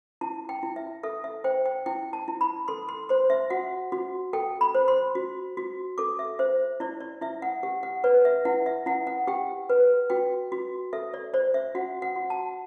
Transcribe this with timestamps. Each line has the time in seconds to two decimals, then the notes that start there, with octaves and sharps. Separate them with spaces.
0.21 E4 A5
0.49 G5
0.63 E4
0.76 E5
1.03 A4 E5
1.24 E5
1.44 C5 G5
1.66 G5
1.86 E4 G5
2.13 A5
2.28 E4
2.41 B5
2.68 A4 C6
2.89 C6
3.09 C5 C6
3.30 E5
3.50 F#4 F#5
3.92 F#4
4.33 A4 G5
4.61 B5
4.75 C5
4.88 C6
5.15 F#4
5.57 F#4
5.98 A4 D6
6.19 E5
6.39 C5 E5
6.80 E4 D5
7.01 D5
7.21 E4 E5
7.42 F#5
7.63 G4 F#5
7.83 F#5
8.04 B4 D5
8.25 E5
8.45 E4 F#5
8.66 E5
8.86 E4 F#5
9.07 F#5
9.27 G4 G5
9.69 B4
10.10 F#4 G5
10.52 F#4
10.93 A4 E5
11.14 D5
11.34 C5 D5
11.54 E5
11.75 F#4 F#5
12.02 F#5
12.16 F#4
12.30 A5